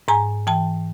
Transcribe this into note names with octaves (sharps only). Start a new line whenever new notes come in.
G#2 G#5 A#5
E3 G5 A5